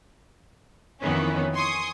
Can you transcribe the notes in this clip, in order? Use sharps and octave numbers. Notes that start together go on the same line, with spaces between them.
F2 D#3 E3 B3 C#4
G#5 C6 C#6 D#6